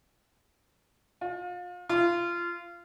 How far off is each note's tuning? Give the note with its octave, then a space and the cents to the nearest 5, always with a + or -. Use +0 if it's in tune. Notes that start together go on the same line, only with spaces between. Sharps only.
F4 +35
F4 -20